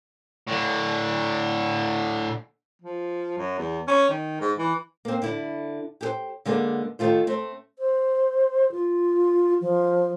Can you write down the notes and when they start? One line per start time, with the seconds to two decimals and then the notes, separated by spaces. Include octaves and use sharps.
0.47 A2 D3
2.82 F3
3.38 F#2
3.58 E2
3.88 C#4
4.10 D#3
4.41 G#2
4.58 E3
5.05 A#3 C4
5.22 D3 D4 E4
6.01 G4 G#4 C5
6.45 D3 G#3 A#3 B3 G#4
6.99 D#3 A3 F4 C5
7.27 A3 C4
7.79 C5
8.71 F4
9.61 F3